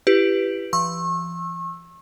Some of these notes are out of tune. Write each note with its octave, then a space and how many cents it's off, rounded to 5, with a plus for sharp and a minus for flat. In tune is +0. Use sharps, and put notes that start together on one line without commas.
E4 +25 G4 +0 B4 +0
F3 -35 C#6 -35 E6 +0